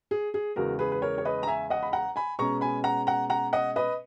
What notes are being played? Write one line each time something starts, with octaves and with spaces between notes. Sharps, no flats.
G#4
G#4
E2 C#3 G#3 F#4 A#4
G#4 B4
B4
A#4 C#5
C#5
B4 D#5
A#5
E5 G#5
D#5 F#5
B5
F#5 A#5
G#5 B5
B2 G#3 C#4 A#5 C#6
G#5 B5
F#5 A#5
F#5 A#5
F#5 A#5
D#5 F#5
B4 D#5